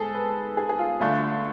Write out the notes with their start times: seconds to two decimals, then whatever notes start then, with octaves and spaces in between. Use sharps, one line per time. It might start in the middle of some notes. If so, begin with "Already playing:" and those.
Already playing: G#2 G#4 A4
0.15 B4
0.57 G#4
0.69 G#4
0.79 F4
1.00 D2 D3 A3 D4 F4